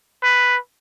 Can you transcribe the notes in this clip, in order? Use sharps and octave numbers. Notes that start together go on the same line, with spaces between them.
B4